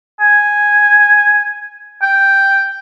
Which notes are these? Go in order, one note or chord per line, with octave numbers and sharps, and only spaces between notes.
G#5
G5